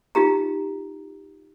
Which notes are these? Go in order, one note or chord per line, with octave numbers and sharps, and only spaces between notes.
D#4 F4 G4 A#5